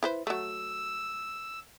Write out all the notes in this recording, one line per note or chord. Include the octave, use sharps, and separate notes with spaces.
E4 B4 C5
F#3 A3 E6